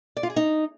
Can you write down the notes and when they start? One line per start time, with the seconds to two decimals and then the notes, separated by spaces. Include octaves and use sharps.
0.17 D5
0.23 F4
0.30 G#4
0.36 D#4